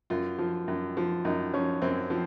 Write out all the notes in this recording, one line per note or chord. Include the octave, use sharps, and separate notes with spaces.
F#2 F4
F3
F#2
F3
F#2 D#4
F3 C#4
F#2 C4
F3 C4